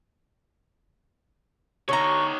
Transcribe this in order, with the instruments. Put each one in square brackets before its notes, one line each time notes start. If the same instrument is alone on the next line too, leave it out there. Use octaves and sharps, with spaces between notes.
[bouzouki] D3 A#5 [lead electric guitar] D#4 C#5 [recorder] C#6